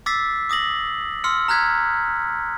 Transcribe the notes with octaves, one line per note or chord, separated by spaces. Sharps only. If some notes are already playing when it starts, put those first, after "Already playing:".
D6 E6 A6 B6 C7
D6 D#6 A#6 F#7
C6 E6 F6 C#7
A#5 F6 F#6 G#6 B6